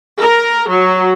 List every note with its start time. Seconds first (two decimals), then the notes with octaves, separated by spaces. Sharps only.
0.18 A#4
0.68 F#3